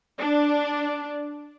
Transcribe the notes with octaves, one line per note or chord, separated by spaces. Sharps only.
D4